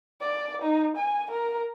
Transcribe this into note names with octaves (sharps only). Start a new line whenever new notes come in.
D5
D#4
G#5
A#4